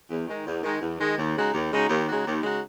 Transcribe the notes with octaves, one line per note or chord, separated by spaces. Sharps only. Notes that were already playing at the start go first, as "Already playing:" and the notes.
E2
D#3 G#3
E2
D#3 G#3
E2
D#3 G#3
D#2
C#3 G#3 D#4 F#4
D#2
C#3 G#3 D#4 F#4
D#2
C#3 G#3 D#4 F#4
D#2
C#3 G#3 D#4 F#4